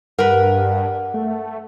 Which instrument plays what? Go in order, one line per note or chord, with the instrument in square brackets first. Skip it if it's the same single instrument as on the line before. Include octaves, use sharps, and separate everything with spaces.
[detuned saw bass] G2 [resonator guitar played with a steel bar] A#4 B4 [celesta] F#5
[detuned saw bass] A3